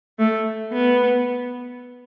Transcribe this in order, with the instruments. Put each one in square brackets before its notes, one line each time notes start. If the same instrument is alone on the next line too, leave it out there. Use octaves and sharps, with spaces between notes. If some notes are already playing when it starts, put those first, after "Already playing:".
[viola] A3
B3